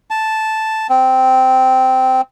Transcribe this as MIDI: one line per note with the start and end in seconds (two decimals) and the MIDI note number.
0.10 0.87 81
0.90 2.21 60